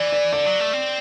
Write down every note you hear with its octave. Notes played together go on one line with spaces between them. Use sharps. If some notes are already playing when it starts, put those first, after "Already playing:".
Already playing: E3 D5
D5
D3 D5
F#3
A3
C4